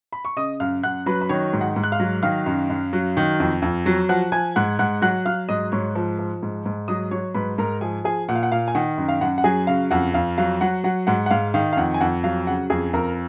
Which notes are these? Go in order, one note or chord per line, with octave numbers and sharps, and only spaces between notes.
B5
C#6
C#3 D#5 D#6
F#2 F5 F6
F#2 F#5 F#6
F#3 B4 B5
B5
D#3 C#5 C#6
G#2
F#5
G#2
F#6
F5 F6
F#3
D#3 F5 F6
F#2
F#2
F#3
D#3
F2
F2
F#3
F3 F#5 F#6
F3 G#5 G#6
G#2 F#5 F#6
G#2 F#5 F#6
F#3 F#5 F#6
F#3 F5 F6
G#2 D#5 D#6
G#2 C#5 C#6
F3
F3
G#2
G#2
F#3 D#5 D#6
F#3 C#5 C#6
G#2 B4 B5
G#2 A#4 A#5
F3 G#4 G#5
F3 G#4 G#5
A#2 F#5
F5
F#5
A#2 F5
G#5
D#3 F#5
F#2
F5
F#2 F#5
F#5
F#3 G#4 G#5
C#3 F5
F2 F#5
F2 F5
F#3 F5
F#3 F#5
F#3 F#5
G#2 F#5
F#5
G#2 F5
D#3 F5
F5
F2 F#5
G#5
F2 F#5
F#3 F5
C#3 F#5
F2 G#4 G#5
F2 A#4 A#5